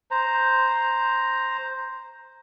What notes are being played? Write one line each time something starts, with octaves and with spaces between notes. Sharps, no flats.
C5 A#5